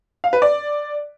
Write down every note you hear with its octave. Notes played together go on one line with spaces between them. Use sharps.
F5
B4
D5